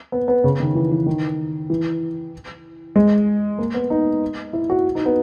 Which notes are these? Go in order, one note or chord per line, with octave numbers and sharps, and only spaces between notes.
B3
B3
C#3
D#3
E3
E3
D#3
E3
G#3
A#3
B3
D#4
E4
F#4
D#4
B3